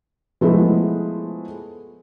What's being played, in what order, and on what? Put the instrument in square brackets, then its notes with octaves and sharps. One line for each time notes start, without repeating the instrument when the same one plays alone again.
[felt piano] F3 G#3 A3 B3 E4